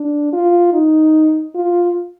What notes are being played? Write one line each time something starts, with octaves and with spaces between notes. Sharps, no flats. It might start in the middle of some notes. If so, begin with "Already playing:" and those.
Already playing: D4
F4
D#4
F4